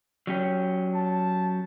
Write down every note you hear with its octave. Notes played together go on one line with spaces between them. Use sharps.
F#3 C#4 G4
A5